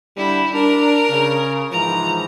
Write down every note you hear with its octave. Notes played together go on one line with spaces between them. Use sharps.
D3 G3 E4
D4 A#4
C#3
G#2 E3 F3 A#5